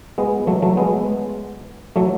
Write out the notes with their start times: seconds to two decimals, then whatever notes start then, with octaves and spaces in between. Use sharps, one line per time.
0.18 G#3 B3
0.47 F#3 A3
0.62 F#3 A3
0.77 G#3 B3
1.96 F#3 A3